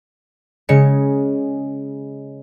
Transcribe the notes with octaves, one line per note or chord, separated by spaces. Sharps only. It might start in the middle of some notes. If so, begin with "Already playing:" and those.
C#3 G#3 C#7